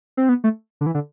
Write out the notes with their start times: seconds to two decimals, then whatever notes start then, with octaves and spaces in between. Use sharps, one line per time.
0.17 C4
0.29 B3
0.44 A3
0.81 D3
0.86 E3
0.95 D3